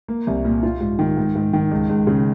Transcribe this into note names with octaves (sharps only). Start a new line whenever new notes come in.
A#3
C2
A#2
F4
G#2
D#3
G#2
G#2
D#3
C#2
C#2
C#3